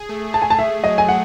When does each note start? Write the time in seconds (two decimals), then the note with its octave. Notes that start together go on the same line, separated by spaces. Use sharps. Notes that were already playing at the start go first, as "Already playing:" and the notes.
Already playing: G#4
0.09 A3
0.33 A3 A5
0.42 G#5
0.50 A5
0.59 A3 E5
0.84 F#3 D#5
0.98 G#5
1.09 A3 F#5